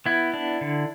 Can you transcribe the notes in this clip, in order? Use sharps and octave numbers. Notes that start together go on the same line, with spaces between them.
B3 E4
D4
D3